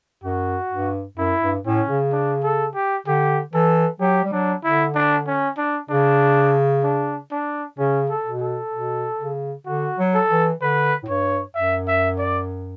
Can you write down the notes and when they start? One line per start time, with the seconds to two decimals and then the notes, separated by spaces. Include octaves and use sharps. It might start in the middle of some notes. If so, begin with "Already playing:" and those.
0.24 F#2 F#4
0.71 G2
1.17 F#2 E4
1.42 G2
1.65 A2 C#4
1.88 C#3
2.12 D4
2.43 A4
2.75 G4
3.07 D3 G4
3.53 E3 A4
4.00 F#3 G4
4.24 G3
4.32 F#3 D4
4.64 D3 E4
4.95 D4
5.27 C#4
5.57 D4
5.89 C#3 D4
6.83 D4
7.31 D4
7.78 C#3 C#4
8.09 A4
8.25 B2
8.42 A4
8.73 B2
9.20 C#3
9.66 D3 F#4
9.98 F#3
10.14 A4
10.30 E3
10.61 D3 B4
11.03 A2
11.08 G2 C#5
11.55 F#2 E5
11.87 E5
12.18 D5